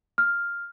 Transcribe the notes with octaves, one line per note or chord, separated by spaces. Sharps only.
F6